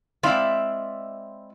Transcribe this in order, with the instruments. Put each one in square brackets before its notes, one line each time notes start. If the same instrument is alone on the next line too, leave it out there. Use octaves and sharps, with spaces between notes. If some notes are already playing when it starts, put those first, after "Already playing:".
[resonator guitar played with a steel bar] G#3 C4 E4 D5 E5 F5